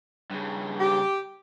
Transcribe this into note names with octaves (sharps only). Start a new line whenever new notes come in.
G2 C#3
G4